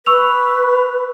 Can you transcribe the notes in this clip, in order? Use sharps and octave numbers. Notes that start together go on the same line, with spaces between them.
B4 C#6 E6 F7